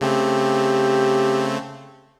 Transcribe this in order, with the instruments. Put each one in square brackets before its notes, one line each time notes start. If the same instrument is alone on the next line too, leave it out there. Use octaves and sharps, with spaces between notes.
[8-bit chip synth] C#3 A3 C4 [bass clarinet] G4